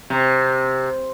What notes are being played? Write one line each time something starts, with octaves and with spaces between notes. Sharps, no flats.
C3